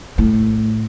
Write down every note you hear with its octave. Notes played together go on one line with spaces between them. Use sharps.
A2